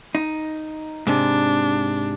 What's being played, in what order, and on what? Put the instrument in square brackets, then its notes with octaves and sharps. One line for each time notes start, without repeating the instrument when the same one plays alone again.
[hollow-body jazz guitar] D#4
[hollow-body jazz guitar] G#2 C3 [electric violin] D4